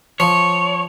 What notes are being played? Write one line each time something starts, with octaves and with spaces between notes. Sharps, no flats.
F3 C#5